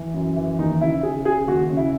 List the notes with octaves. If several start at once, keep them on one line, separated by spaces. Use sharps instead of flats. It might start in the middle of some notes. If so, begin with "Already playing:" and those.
Already playing: E3
F#2
E3
D#2 D#4
C#3 E4
C#3 G#4
C#3 G#4
D#2 F#4
C#3
E4